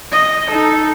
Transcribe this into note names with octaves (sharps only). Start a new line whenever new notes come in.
D#5
D#4 A4